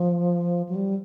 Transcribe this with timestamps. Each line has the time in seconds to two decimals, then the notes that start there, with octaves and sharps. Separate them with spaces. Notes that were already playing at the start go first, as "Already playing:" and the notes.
Already playing: F3
0.69 F#3
0.75 G3